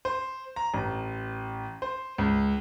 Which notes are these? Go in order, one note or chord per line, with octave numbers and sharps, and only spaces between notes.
C5
A#5
A1
C5
C#2